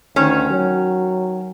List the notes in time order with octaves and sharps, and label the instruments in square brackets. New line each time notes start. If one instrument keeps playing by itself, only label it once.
[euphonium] D2 [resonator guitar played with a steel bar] D#3 C#4
[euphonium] F#3